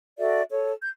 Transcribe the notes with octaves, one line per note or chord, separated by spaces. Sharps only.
F#4 A4 D5 E5
A4 C#5
G6